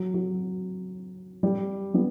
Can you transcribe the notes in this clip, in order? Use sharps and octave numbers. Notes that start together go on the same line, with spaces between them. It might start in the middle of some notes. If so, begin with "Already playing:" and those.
Already playing: F#3
F#3
G3
G3 B3